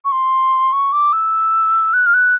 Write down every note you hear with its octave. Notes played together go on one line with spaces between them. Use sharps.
C#6
C6
C#6
D6
E6
F#6
F6
F#6